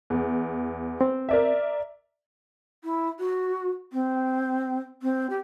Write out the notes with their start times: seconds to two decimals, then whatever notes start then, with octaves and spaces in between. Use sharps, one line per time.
0.10 E2
1.01 C4
1.29 A#4 D5 E5
2.84 E4
3.19 F#4
3.93 C4
5.03 C4
5.30 G4